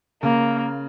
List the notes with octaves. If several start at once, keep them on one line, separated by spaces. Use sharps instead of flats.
C#3 A#3